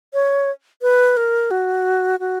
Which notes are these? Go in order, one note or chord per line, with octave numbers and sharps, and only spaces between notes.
C#5
B4
A#4
F#4
F#4